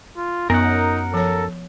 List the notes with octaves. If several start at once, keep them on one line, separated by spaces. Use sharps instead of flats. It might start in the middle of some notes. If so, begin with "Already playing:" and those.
F4
F#2 B3 D#4 A#4 F#5
F3 A4 C#5